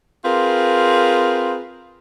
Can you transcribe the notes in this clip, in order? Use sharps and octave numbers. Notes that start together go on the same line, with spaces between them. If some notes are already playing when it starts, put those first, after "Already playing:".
C4 F4 G#4 A#4 B4